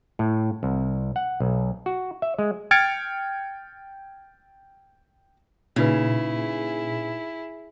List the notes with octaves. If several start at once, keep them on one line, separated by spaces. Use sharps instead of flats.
A2
C2
F#5
B1
F#4
E5
G#3
G5 F6 G#6 A6 C#7 D7
A#2 C#3 D#4 E4 F#4 G#4 B4